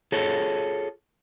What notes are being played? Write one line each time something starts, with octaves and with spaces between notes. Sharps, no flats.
F4 G#4 A4 C#5